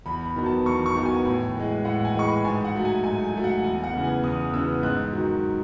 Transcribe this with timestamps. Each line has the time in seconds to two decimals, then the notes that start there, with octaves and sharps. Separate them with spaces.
0.06 E2 B5
0.26 B5
0.36 D#3 F#3 B3
0.46 A5
0.66 E2 C#6
0.86 C#6
0.95 D#3 F#3 B3
1.06 G#5
1.25 A2 G#5
1.55 E3 G#3
1.85 A2 F#5
2.05 G#5
2.14 E3 G#3 C#6
2.25 B5
2.45 G#2 G#5
2.65 F#5
2.75 F#3 A3
2.85 G#5
3.04 G#2 G#5
3.24 G#5
3.34 F#3 A3
3.44 F#5
3.64 E2 G#5
3.84 F#5
3.94 C#3 E3 B3
4.04 G#5
4.23 E2 D#6
4.54 C#3 E3 B3 E6
4.83 G#2 F#6
5.13 D#3 F#3